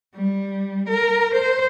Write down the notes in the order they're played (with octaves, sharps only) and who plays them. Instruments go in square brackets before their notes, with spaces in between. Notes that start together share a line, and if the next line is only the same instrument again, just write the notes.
[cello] G3
A#4
C5